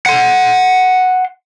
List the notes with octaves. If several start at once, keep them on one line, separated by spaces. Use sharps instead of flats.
F#5 C6